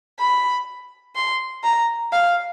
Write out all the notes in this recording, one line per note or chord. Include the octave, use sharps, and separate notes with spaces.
B5
C6
A#5
F5